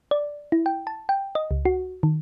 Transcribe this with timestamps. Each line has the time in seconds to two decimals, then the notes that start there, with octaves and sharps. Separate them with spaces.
0.11 D5
0.52 E4
0.66 G5
0.87 A5
1.09 G5
1.35 D#5
1.51 C#2
1.65 F#4
2.03 D#3